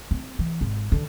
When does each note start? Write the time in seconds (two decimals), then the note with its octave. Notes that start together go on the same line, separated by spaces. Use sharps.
0.11 C4
0.39 E3
0.61 G#1
0.92 D3